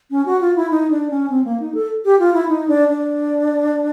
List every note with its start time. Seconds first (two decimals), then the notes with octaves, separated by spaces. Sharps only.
0.11 C#4
0.26 F#4
0.41 F4
0.56 E4
0.71 D#4
0.91 D4
1.11 C#4
1.30 C4
1.45 A#3
1.60 D#4
1.74 A4
2.05 G4
2.19 F4
2.34 E4
2.49 D#4
2.68 D4
2.89 D4